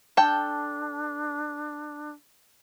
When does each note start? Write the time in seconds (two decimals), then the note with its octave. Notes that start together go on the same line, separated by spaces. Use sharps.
0.17 D4 A4 G5